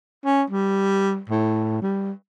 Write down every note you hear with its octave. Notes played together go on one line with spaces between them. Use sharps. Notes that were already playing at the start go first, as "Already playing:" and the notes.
C#4
G3
A2
G3